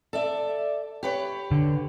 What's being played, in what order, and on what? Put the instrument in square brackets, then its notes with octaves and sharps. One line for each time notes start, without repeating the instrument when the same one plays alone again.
[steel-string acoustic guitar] A4 D5 E5
G4 B4 C#5
[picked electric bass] D3